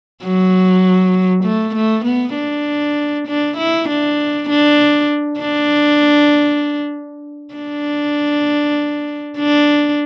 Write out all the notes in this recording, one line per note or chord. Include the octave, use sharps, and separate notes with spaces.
F#3
A3
A3
B3
D4
D4
E4
D4
D4
D4
D4
D4